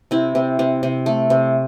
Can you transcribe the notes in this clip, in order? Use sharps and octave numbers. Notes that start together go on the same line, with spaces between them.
C3 C4 E4
C3
C3
C3
A3
C3